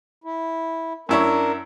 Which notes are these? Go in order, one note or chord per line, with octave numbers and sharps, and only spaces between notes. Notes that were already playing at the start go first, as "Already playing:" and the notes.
E4
F#2 D4 E4 A#4 C#5